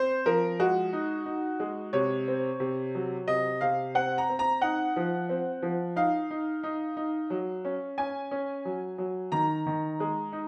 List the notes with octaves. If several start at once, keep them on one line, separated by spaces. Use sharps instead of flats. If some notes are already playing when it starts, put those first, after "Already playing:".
Already playing: C4 C5
F3 A#4
G#3 F#4
D#4
D#4
G#3
C3 C#5
C4
C3
F#3
C3 D#5
C3 F5
C4 F#5
A#5
C4
A#5
D#4 F#5
F3
C4
F3
D#4 F5
D#4
D#4
D#4
F#3
C#4
C#4 G#5
C#4
F#3
F#3
D#3 A#5
D#3
G#3
D#4